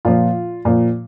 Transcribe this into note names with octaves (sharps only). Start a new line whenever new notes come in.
A#2 F3 F4
A#2 F3